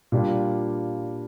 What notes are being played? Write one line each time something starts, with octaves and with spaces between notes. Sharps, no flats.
A#2 G3 D4 F4